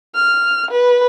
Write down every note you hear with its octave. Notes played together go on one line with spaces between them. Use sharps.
F6
B4